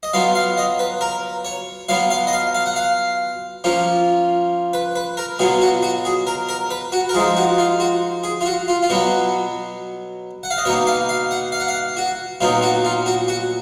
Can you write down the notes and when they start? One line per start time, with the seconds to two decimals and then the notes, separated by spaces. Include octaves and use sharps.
0.03 D#5
0.13 F#3 B3 F4 F5
0.35 F5
0.58 D#5
0.79 B4
1.01 A#4
1.45 C#5
1.89 F#3 B3 F4 F5
2.10 F5
2.27 D#5
2.33 F5
2.55 F5
2.66 F#5
2.76 F5
3.64 F3 A#3 C#4 F4
4.73 B4
4.96 B4
5.17 A#4
5.39 B2 F#3 B3 F4 G#4
5.61 F#4
5.83 F#4
6.05 G#4
6.27 A#4
6.49 A#4
6.71 B4
6.92 F#4
7.09 A#4
7.14 F3 G#3 D#4 G#4
7.36 F#4
7.58 F4
7.80 F#4
8.24 G#4
8.41 F4
8.46 F#4
8.68 F4
8.83 F4
8.90 B2 F#3 B3 F#4
10.43 F#5
10.50 F5
10.58 D#5
10.65 B2 A#3 D#4 C#5
10.87 F5
11.09 F5
11.31 F#5
11.52 F5
11.60 F#5
11.68 F5
11.97 F#4
12.41 A#2 F#3 B3 D#4 F4
12.62 F#4
12.85 F4
13.06 F#4
13.28 F#4